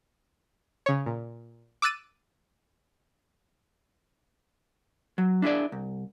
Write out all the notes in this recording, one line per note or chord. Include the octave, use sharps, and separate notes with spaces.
C#3 C#5
A#2
D6 E6 F#6 A6 D#7
F#3
D4 E4 G#4 D5
C2